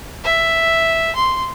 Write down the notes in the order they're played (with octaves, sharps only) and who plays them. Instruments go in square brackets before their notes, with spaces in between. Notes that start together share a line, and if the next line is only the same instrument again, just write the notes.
[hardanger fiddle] E5
C6